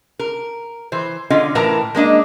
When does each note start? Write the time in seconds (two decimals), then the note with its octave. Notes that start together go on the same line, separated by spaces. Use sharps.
0.19 A#4
0.92 E3 C5
1.30 D3 C#4 F4 D#5
1.55 A2 E3 A#4 A5 A#5
1.95 G#3 A#3 D4 D#5